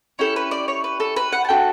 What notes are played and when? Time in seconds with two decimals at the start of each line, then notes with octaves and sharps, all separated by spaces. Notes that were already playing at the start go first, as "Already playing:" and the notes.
0.19 C#4 E4 G4 A4
0.36 B4
0.51 D5
0.68 C#5
0.84 B4
1.00 A4
1.16 B4
1.33 F#5
1.44 A5
1.49 D4 F#4 A4 G5